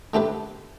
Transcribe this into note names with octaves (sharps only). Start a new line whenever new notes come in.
D3 A3 G4 B4